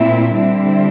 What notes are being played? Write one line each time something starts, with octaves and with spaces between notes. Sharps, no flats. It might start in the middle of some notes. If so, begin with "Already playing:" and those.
Already playing: A#2 A3 C4 E4
D3 G3 C4 E4